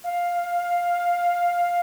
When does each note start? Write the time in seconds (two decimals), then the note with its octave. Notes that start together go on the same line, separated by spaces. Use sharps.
0.04 F5